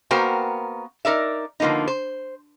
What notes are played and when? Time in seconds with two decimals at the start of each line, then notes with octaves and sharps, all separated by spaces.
0.11 A#3 B3 F#4 A#4 C5 G5
1.05 D#4 A#4 D5 E5
1.60 D3 F3 A#3 B3 D#4
1.88 C5